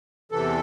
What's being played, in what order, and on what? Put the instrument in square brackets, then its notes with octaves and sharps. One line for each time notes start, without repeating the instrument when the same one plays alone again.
[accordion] E2 C3 E3 A4